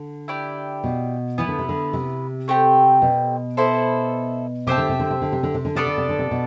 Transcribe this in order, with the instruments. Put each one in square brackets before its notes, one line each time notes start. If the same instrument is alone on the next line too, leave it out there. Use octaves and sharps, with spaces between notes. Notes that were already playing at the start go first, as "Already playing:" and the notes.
Already playing: [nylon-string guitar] D3
[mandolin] E4 G4 D5
[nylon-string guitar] B2
[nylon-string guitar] E3 [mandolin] B3 E4 B4
[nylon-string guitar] D3
C3
D3
C3
[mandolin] A3 C4 G4
[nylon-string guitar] B2
[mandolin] B3 E4 A4 C5
[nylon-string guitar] C3 [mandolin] G4 C5 E5 A5
[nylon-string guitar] D3
C3
D3
C3
D3
C3
D3
C3
D3
[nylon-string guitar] C3 [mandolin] B3 D4 A4 D5
[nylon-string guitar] D3
C3
D3
C3
B2